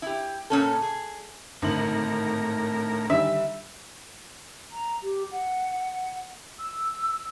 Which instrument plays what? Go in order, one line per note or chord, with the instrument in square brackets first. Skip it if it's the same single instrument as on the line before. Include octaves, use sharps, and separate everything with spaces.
[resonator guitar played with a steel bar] E4 G4
A#2 C#4 A4
G#4
[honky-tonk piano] G#1 D3 F#7 [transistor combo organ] A2 A#4
[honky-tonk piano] D3 D#3 G3 [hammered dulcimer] E5
[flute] A#5
G4
F#5
E6